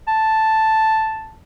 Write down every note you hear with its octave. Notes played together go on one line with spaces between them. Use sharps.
A5